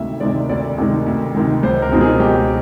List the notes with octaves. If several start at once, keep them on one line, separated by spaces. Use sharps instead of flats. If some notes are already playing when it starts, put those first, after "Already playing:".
Already playing: D2 C3 D#3 G#3 E5
C3 D#3 G#3 D5
D2 D5
C3 D#3 G#3
D2
C3 D#3 G#3
C#2 C5
A#4
B2 G#3 C4 D#4
G#4
C#2 G4